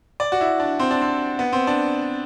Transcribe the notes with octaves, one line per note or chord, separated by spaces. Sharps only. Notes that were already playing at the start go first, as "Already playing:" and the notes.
D5
F#4
E4
D4
C4
D4
C4
B3
C4
D4